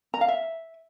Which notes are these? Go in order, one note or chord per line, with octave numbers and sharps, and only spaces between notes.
A#5
F5
E5